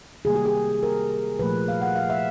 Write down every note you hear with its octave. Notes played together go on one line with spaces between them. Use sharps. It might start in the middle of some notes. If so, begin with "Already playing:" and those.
C3 D#3 G3 A#3 G#4
G4
G#4
A#4
A#2 F3 A3 B4
F5
F#5
F5
E5